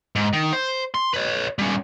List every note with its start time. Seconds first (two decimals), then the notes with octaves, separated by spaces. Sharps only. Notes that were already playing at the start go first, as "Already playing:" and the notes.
0.16 G#2
0.33 D#3
0.53 C5
0.94 C6
1.14 B4 C#5
1.59 G3 C#4